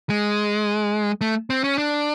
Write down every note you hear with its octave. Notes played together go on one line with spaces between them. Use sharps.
G#3
A3
C4
C#4
D4